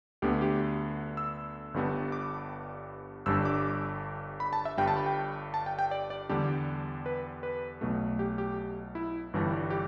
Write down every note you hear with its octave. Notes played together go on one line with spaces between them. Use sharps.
D2 D3 B3 G4
G4
E6
G1 G2 G3 B3 D4
D6
G1 G2 G3 D4 E6
D6
B5
A5
E5
G1 G2 G3 G5
A5
B5
G5
A5
G5
G5
D5
D5
E2 D3 G3 D4 G4
B4
B4
B1 B2 A3
G4
G4
E4
G1 G2 E3 G3 D4
G4